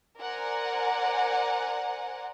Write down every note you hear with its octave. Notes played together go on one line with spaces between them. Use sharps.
A#4 C5 D5 F#5 G#5 A#5